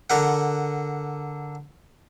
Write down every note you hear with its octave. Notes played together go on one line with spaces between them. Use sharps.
D3 A#4 F#5